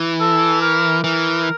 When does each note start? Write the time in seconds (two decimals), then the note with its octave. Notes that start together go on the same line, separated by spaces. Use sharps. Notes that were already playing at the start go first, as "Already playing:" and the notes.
Already playing: E3
0.21 A4
0.61 A#4
1.04 E3 A#4